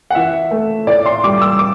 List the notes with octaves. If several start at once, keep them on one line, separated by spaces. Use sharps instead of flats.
F#5
E3 E5
A3
A2 D5
C6
G3 D6
E6
D6